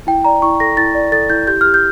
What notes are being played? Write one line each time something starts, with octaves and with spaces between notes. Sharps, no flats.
E4 G5
D5 A#5
E4 C#6
A4 A#6
E4 A6
D5
A4 A6
E4 G6
G4 G6
G4 F6
G6